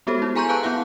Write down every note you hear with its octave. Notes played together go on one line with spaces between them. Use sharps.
G#3 B3 F#4 G4 A4 C5
E4
G#4 G#5 A#5 C6 C#6 G6
B4 F5 A5 A#5 C#6 F#6
B3 E4 F5 F#5